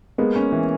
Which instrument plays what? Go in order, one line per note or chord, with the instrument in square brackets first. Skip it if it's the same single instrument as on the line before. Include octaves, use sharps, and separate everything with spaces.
[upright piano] G#3 B3 [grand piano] A#3
[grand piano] C#4
E3